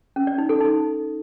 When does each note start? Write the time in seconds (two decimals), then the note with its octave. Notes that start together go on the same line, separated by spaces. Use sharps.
0.16 C#4
0.27 D5
0.38 D#4
0.49 A4
0.60 D#4